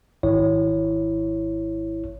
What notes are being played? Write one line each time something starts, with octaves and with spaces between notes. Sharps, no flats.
G#1 E4 C#5